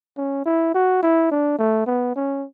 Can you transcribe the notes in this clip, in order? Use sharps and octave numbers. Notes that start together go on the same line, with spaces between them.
C#4
E4
F#4
E4
D4
A3
B3
C#4